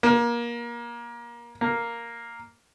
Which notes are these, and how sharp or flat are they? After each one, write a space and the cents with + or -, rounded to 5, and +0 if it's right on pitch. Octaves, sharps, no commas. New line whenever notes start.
A#3 +25
A#3 +0